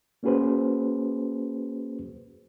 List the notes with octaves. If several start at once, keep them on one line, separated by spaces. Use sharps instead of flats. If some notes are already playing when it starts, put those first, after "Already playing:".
A#3 C#4 F#4 G#4 B4 C5